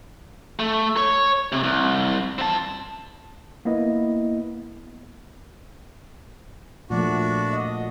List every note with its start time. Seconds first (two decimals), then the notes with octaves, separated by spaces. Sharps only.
0.59 A3
0.97 C#5
1.52 C3
1.63 C2
2.39 C4 A5
3.65 A#3 B3 E4 D#5
6.90 A#2 F3 A3 D4 F#4
7.53 D#5